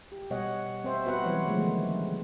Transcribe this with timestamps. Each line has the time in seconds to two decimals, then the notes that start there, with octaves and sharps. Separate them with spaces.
0.12 G4
0.30 B2 G3 C#5 D#5 F#5
0.84 C4 C5 E5
1.05 B3 F#4 B4 F#5
1.25 E3 F#3 G3 C#5
1.46 D3 D#3 F3 G#3 A3 B3